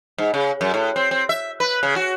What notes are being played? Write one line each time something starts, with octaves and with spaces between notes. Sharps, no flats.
G#2
C#3
F#2
A2
C4
C4
E5
B4
C#3
F#4